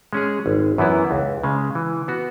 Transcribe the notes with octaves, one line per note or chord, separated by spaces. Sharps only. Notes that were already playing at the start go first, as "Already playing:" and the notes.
G#3 C#4 G#4
G#1
F#2 E3 B3 E4
C#2
C#3 G#3
E3
B3 F#4